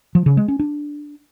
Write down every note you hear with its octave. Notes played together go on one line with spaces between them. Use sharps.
F3
C#3
G#3
C#4
D4